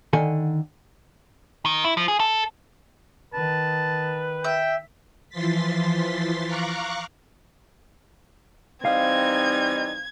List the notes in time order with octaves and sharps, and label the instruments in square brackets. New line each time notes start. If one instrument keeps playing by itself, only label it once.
[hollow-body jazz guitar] D3 D#3 A4 F#5 G#5
[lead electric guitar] D#3
E4
F3
G#4
A4
[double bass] D#3 [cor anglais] B4 [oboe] A5
[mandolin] E5 [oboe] G5
[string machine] E3 F3 C6 A6 B6
F5 A#5 C#6 D6 F#6
[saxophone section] E3 G3 D#4 [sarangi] C4 [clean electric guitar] F5 [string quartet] G#6